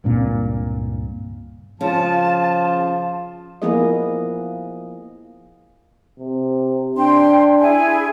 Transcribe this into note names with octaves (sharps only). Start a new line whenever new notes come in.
C#2 G2 A#2 C4
C#3 F3 F4 A5
F3 A#3 B3 E4 G#4 D#5
C3
D4 G5 C6
E4 G#4 G#5